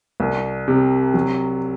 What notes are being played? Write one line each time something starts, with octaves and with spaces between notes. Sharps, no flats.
C2
C3
F#3